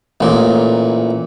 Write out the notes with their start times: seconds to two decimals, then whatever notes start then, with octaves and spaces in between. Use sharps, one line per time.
0.21 A1 A#2